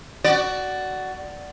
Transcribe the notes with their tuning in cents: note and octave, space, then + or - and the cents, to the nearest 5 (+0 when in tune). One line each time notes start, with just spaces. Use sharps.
F#4 +15 D5 +0